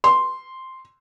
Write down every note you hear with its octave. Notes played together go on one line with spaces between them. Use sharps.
C6